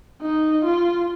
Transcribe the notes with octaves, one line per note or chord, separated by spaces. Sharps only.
D#4
F4